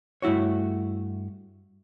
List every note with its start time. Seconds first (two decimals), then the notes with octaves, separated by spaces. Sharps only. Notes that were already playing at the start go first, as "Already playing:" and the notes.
0.22 G2 A3 E4 F#4 C#5